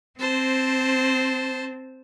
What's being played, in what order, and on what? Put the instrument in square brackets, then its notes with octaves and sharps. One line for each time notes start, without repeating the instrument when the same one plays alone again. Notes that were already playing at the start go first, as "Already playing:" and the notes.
[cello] C4 [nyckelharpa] C5 A5